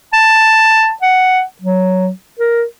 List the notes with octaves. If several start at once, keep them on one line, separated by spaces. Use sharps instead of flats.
A5
F#5
F#3
A#4